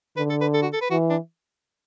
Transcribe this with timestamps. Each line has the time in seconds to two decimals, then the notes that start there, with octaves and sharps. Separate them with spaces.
0.17 D3 B4
0.30 A4
0.41 B4
0.54 A4
0.63 F#4
0.73 A4
0.82 B4
0.91 E3 F#4
1.10 D4